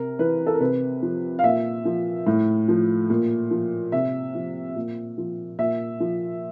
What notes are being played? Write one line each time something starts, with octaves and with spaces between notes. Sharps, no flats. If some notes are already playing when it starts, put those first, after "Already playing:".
Already playing: C3 A#4
E3 B4
A4
A#4
C3 B4
F3
F5
A#2 E5
F3
A2
F3
A#2
F3
C3 E5
F3
A#2
F3
A#2 E5
F3